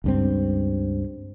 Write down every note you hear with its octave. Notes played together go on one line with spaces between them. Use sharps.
C#2 G2 C4